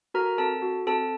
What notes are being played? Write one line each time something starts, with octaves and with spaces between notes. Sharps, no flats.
F#4 A4 A#4 A#5
C4 A4 A5
F#4 A4
C4 A4 A5